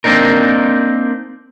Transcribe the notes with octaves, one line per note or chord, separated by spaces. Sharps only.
A#3 C4 D4 D#4 A#4